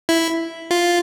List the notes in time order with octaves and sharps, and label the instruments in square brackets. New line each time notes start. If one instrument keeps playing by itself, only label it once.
[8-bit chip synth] E4
F4